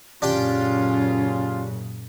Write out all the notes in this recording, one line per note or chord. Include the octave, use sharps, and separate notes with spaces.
F#2 A#2 C#3 C#4 D4 F4 G4 G5